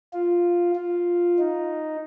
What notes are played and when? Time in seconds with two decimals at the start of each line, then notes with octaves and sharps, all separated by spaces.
0.13 F4
0.75 F4
1.39 D#4